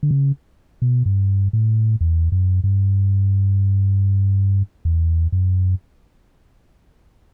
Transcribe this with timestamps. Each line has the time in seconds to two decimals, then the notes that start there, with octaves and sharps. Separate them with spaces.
0.03 D3
0.11 C#3
0.82 B2
1.06 G2
1.53 A2
2.01 E2
2.32 F#2
2.64 G2
4.85 E2
5.32 F#2